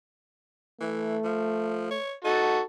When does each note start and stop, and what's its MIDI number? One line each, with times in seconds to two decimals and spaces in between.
0.80 1.18 52
0.80 1.97 57
1.24 1.86 53
1.91 2.14 73
2.24 2.60 63
2.24 2.60 66
2.24 2.60 69